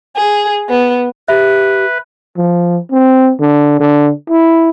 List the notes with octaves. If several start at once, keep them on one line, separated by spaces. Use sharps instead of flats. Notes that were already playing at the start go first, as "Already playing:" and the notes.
G#4
B3
G4 B4 E5
F3
C4
D3
D3
E4